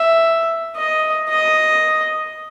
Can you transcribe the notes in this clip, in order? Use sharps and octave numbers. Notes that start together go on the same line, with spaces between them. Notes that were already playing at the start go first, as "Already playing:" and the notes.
Already playing: E5
D#5
D#5